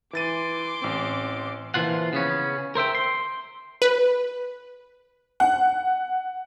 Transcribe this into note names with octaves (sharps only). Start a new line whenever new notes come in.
E3 C6 D6 A6 D#7
A1 C4
A#2 E3 F3 F4 F#5
C#3 B3 C#4
A#4 C5 E5 G5
C6
B4
F#5